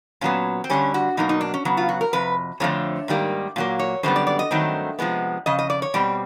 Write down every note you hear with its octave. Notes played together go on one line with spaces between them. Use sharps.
A#2 F#3 B3 C#4
C4
G2 D3 G3 C#4
F#4
B2 F#3 A#3 D#4
D#4
D4
C#4
C#3 F#3 B3
F4
F#4
A#4
F2 C3 B4
F2 D3 F3 A3 C4 C#5
G#2 D#3 G3 A#3
A#2 F#3 A#3
C#5
F#2 D3 G3 B3 C5
D5
D5
D#5
G2 D#3 F#3 A3 C4
C3 F3 G#3 B3
F2 C#3 D#5
D#5
D5
C#5
B2 G3 C4 D5